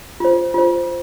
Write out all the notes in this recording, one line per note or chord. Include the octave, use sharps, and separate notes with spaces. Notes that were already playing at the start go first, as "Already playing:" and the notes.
F4 C5
F4 C5